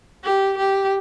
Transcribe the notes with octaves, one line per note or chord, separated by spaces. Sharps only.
G4
G4